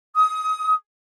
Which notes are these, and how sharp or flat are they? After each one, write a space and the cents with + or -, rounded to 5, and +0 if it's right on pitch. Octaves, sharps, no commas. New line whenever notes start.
D#6 +25